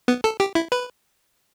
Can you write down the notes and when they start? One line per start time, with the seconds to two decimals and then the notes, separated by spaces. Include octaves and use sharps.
0.08 B3
0.24 A4
0.40 G4
0.55 E4
0.72 B4